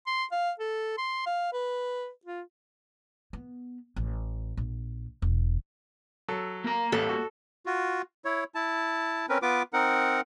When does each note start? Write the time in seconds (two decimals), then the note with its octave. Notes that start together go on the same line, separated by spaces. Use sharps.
0.07 C6
0.32 F5
0.59 A4
0.98 C6
1.26 F5
1.53 B4
2.25 F4
3.33 B3
3.96 A1
4.57 A#1
5.22 E1
6.28 F#3 A4 E6
6.64 A#3 A#5
6.92 A1 G3 A#3 A4
7.09 F#4
7.66 F4 F#4
8.25 E4 C#5
8.55 E4 A5
9.29 C4 C#4 A#4 B4
9.42 B3 F4 B4 D6
9.73 C4 D#4 A#4 F#5